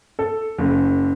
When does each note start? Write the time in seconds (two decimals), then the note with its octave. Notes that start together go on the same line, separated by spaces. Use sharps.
0.19 A4
0.58 F#1